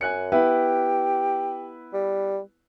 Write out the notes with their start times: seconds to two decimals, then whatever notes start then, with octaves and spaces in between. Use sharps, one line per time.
0.01 F#2 G#5 F#6 C#7
0.32 B3 E4 G4 B4
1.93 G3